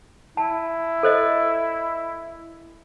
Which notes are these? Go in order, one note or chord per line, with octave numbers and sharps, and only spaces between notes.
E4 A5
A4 C5 D#5